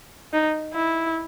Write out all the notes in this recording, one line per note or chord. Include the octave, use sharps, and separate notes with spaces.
D#4
E4